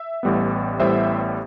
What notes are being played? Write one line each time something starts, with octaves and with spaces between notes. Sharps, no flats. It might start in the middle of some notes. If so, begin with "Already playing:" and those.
Already playing: E5
A1 A2 G3 B3
A1 A2 G3 B3 C5 E5